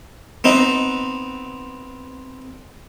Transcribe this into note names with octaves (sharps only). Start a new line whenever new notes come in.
B3 C4 D#4